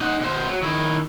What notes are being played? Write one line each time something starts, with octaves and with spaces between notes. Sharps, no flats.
D#4 F#5
B2 C5
F#3
D#3 E4